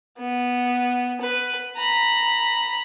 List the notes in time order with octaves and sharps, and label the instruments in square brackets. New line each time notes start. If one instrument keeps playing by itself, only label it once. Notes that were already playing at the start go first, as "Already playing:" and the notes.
[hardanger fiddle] B3
B4
A#5 B5